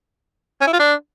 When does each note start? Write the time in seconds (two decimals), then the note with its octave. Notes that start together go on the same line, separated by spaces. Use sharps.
0.61 C#4
0.67 E4
0.73 F4
0.79 D4